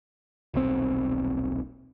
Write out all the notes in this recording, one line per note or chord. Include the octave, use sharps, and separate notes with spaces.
D#1 B1 C4